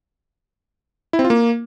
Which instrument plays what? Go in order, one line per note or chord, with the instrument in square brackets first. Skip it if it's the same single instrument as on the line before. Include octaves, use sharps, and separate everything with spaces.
[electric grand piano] E4
C4
F4
A#3